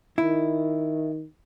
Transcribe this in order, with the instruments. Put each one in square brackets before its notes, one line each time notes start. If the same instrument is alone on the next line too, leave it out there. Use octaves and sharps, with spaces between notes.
[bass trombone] D#3 [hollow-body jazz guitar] E4